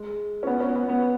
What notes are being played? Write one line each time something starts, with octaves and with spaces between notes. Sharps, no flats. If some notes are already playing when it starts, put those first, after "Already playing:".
Already playing: G#3
C#4
B3
C#4
B3
B3